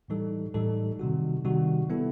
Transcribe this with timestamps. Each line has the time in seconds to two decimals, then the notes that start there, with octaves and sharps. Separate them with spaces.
0.08 A2 E3 G3 D#4 A4
0.54 A2 E3 G3 D#4 A4
0.99 C3 D#3 G3 D#4 F#4
1.45 C3 D#3 G3 D#4 F#4
1.90 G3 B3 E4 A4